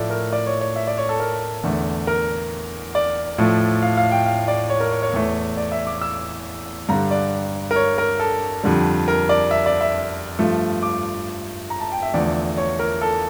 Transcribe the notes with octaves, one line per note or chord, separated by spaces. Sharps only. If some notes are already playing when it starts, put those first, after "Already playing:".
Already playing: A2 F3 A3 D5
A#4
D5
C#5
C#5
E5
D5
C#5
A4
A#4
E2 D3 A3
A#4
D5
A2 F3 A3
F5
F5
G5
F5
D5
C#5
A#4
C#5
C#5
E2 E3 A3
D5
E5
D6
E6
G2 D3 G3 A#5
D5
A#4
C#5
A#4
A4
F2 D3 G3
A#4
D5
E5
D5
E5
G2 F3 A3
D6
A#5
A5
G5
E5
E2 D3 F3 A3 D5
C#5
A#4
A4